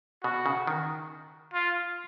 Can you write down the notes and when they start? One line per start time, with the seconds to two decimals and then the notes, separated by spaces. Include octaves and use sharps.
0.23 B2 F#4
0.46 C#3
0.67 D#3
1.54 F4